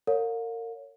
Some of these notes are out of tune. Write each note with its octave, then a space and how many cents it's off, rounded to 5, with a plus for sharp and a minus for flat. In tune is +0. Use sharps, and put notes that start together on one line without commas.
A#4 -30 C#5 +10 F5 +40